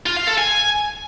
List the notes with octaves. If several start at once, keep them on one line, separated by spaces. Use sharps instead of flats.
F4
F5
A4
G#5